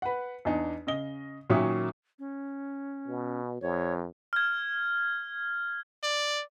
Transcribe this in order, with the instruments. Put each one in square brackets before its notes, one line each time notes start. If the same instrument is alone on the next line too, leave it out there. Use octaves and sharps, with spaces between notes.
[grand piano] B4 F#5
E2 D4 D#4
C#3 D#5 G7
A#2 D#3 F#3 C#4 E5 D#6
[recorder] C#4
[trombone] B2
[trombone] F2 [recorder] C#5
[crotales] F6 G#6
[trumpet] D5